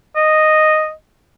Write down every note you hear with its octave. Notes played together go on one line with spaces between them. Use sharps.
D#5